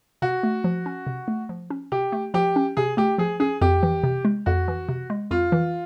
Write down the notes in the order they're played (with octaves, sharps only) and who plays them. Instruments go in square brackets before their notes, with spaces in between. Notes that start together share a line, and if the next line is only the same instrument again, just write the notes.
[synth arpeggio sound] C3 [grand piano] F#4
[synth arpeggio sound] A3
F3
C#4
C3
A3
F3
C#4
[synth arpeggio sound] C3 [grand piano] G4
[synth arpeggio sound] A3
[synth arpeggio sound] F3 [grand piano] G4
[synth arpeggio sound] C#4
[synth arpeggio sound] C3 [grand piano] G#4
[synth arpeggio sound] A3 [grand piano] G4
[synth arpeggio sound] F3 [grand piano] G#4
[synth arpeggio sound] C#4 [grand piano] G#4
[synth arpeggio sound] F2 [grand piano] G4
[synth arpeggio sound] E3
C3
G#3
[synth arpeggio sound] F2 [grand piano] F#4
[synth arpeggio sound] E3
C3
G#3
[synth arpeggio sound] F2 [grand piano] F4
[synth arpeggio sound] E3